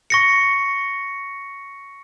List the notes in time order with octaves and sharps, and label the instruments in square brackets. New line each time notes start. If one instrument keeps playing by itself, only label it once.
[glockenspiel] C#6 A#6 C#7